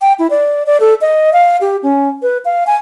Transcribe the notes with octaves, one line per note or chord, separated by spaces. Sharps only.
G5
E4
D5
D5
A4
D#5
F5
G4
C#4
B4
F5
G#5